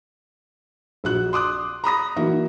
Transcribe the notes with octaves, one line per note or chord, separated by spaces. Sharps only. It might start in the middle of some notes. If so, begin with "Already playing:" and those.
A#1 F#4 F#6
C6 D6 D#6 F#6
A#5 B5 D#6 A#6
E3 A#3 D#4 F#4